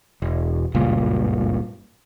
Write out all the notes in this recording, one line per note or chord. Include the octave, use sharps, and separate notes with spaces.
E1
F#1 C#2 G2 A#2